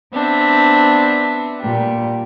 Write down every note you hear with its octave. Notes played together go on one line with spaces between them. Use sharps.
B3 C4 D4 E5
A#2 G3